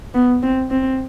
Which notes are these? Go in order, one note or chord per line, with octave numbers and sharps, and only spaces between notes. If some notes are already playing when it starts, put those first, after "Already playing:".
B3
C4
C4